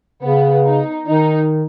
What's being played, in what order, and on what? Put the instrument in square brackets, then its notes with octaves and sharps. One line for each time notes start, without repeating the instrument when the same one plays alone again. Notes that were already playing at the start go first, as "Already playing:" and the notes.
[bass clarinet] C#3 [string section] B3
[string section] D#4
[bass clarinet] D#3 [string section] D#4